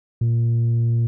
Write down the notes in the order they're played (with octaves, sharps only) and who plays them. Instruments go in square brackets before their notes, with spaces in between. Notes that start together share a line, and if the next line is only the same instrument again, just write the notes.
[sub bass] A#2